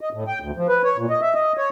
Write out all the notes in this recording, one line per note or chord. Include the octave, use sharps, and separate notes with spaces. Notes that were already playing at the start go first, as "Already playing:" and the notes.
D#5
A2
G5
D2
F3
B4
C#5
A#2
D#5
E5
D#5
C#5